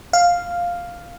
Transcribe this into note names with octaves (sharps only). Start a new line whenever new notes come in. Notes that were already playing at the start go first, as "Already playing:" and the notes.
F5